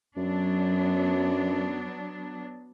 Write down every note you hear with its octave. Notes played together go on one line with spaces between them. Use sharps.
F#2 F#3 B3 D4